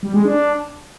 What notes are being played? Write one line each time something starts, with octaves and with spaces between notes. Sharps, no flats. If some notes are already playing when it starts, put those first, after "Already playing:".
G3
G#3
D4